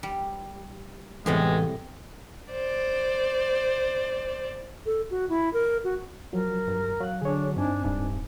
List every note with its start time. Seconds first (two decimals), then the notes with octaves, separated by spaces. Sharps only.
0.03 G3
1.26 A1 A2 C3 G3 G#3 B3
2.50 C5 D5
4.86 A4
5.11 F#4
5.29 E4
5.53 A#4
5.84 F#4
6.33 F3 F#3 A#4
6.68 G2
7.00 F#3 F5 F#6
7.21 D3 D4 G#4 C#5
7.56 G2 C4 D4 D#4 G#5
7.85 D1 G2 D4